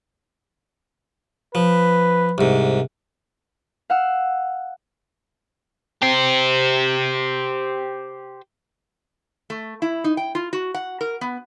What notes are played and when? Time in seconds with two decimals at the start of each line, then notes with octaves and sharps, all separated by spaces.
1.55 F3 B4
2.38 C2 G#2
3.90 F5 F#5 E6
6.02 G4 C5
9.50 A3
9.82 E4
10.04 D#4
10.17 G5
10.35 F4
10.53 F#4
10.74 F#5
11.01 A#4
11.21 B3